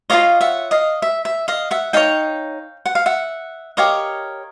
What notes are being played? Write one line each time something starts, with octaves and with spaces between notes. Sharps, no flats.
F4 A#4 C#5 D#5 F5
E5 F#5
D#5 F5
E5
E5
D#5 F5
E5 F#5
D#4 G#4 C#5 F5 G5
F#5
F5
E5 F#5
G4 A#4 C#5 D#5 F5